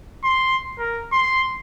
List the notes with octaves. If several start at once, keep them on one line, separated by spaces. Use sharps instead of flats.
C6
A#4
C6